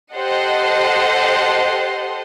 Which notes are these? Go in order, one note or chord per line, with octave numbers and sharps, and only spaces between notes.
G4 A4 C5 D#5 F#5 C6